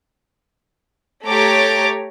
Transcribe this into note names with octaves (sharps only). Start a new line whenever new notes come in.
A3 G4 C#5 A#5 D6 A6